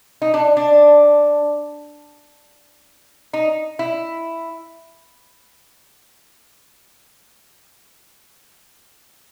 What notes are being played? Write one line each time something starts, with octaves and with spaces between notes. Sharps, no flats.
D#4
D4
D4
D#4
E4